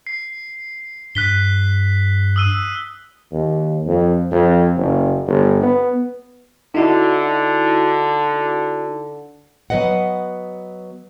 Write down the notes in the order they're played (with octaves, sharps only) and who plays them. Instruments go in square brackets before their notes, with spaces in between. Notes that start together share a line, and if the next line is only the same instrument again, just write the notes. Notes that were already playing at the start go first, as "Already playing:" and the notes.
[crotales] C7
[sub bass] G2 [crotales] F#6 B6 G7
[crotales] D#6 E6 D#7
[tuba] D#2
F2
F2
F#1
G1
B3
[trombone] D3 [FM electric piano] D#4 E4 F#4
[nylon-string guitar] F#3 B3 B4 D#5 F#5